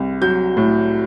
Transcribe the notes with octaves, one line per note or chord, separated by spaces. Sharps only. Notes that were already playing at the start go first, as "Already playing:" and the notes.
Already playing: C2
F#3 G6
A2